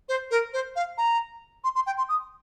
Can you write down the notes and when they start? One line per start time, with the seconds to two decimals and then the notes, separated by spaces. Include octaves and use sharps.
0.09 C5
0.31 A#4
0.53 C5
0.76 F5
0.98 A#5
1.64 C6
1.75 C6
1.87 G5
1.98 C6
2.09 D#6